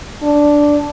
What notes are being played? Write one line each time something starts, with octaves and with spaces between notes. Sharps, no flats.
D4